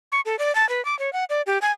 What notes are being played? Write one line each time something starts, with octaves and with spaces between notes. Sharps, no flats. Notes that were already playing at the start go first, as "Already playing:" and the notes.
C#6
A4
D5
A5
B4
D6
C#5
F#5
D5
G4
G#5